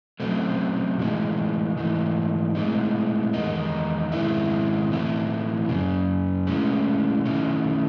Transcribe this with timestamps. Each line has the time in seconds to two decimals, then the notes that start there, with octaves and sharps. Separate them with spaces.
0.20 C#3 F#3 A3 C4
0.98 A2 E3 G#3 D#4
1.76 G#2 E3 A3 D#4
2.55 A2 G#3 C4 D#4
3.33 E2 D#3 G#3 D#4
4.12 G#2 D#3 G#3 C4 E4
4.90 A2 E3 C4 E4
5.68 F#2 C#3
6.47 A2 G#3 C#4 E4
7.26 D#3 A3 C#4 E4